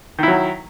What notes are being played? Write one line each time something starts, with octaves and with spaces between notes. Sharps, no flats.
D#3 F#3 E4